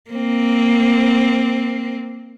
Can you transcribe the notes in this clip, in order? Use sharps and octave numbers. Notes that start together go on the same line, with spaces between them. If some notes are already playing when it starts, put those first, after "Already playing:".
A#3 C4